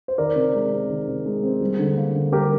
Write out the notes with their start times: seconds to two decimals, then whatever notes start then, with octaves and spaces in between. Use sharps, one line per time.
0.08 C5
0.18 D#3 A#4 D5
0.36 C3
0.54 G#3
0.72 C4
0.89 D#3
1.08 C3
1.26 G#3
1.43 C4
1.61 G3
1.79 D3
1.97 A#3
2.15 D3
2.32 G3 G4 A#4